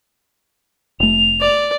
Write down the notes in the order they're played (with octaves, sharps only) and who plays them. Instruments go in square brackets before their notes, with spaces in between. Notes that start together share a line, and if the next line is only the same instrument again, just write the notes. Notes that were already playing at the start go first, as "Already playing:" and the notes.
[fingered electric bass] F1 A3 [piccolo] F7
[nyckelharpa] D5